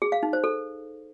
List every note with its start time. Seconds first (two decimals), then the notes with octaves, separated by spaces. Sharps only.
0.02 G#4
0.12 F5
0.23 D#4
0.33 C5
0.44 A4